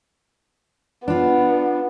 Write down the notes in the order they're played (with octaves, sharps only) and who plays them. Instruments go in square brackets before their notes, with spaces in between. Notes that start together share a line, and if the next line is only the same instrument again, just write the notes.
[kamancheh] B3 [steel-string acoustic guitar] D4 F4